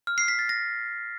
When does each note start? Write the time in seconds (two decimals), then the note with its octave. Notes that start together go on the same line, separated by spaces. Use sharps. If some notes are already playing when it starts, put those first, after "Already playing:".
0.07 F6
0.18 C7
0.28 B6
0.39 A6
0.49 A#6